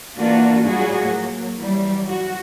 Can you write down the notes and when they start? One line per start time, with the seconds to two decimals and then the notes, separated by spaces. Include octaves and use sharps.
0.16 E3 A#3 D4 F4 F#4
0.65 A2 F#3 G3 F4 F#4 G#4
1.00 F#3 A#3
1.57 E3 F#3 G3
2.06 F#4